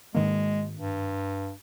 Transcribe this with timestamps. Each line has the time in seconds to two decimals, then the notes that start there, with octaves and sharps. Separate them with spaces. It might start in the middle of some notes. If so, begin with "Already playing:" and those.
0.15 G#2 D#3 G#3 A#3
0.76 G2